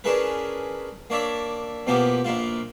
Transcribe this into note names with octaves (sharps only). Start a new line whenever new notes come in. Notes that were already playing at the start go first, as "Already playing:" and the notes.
C#4 D4 E4 G#4 A#4 B4
A#3 D4 C#5 D5 E5
B2 F3 A#3 B3 E4 G4
A#1 A#3 E4 F4